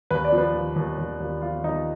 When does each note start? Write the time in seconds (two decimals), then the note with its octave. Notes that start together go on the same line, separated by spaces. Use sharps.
0.10 D#2 B4
0.25 D5
0.33 F3
0.38 B4
0.55 D#2
0.76 D#2
0.98 D#2
1.20 D#2
1.42 F3 F4
1.64 D#2 D#4